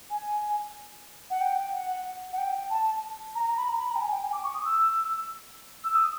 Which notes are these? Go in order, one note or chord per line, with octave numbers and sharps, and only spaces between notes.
G#5
F#5
G5
F#5
F#5
G5
A5
A#5
A#5
B5
A#5
B5
A#5
G5
G#5
G5
G#5
D6
C#6
D#6
E6
E6
D#6